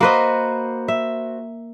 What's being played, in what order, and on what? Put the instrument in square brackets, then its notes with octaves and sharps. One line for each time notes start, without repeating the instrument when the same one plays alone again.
[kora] A#3 B4 D#5 [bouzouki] F#4 C5
[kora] E5